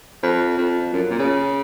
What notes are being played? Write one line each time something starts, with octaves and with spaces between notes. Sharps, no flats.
F2
F2
F#2
A#2
C#3